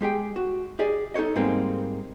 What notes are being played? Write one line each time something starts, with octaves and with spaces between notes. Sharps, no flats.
G#3 G4 G#4 G5
F#4
G4 G#4 D5 D#5
D#4 A4 C5 C#5 D#5
G#2 G3 G#3 A#3 C4